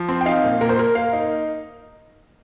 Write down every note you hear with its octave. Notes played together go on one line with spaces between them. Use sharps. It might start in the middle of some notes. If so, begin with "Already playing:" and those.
Already playing: F3
C4
G5
D#4 F5
A#2
A#2 A#4
C5
A#3 A#4
A#3 F5
D#4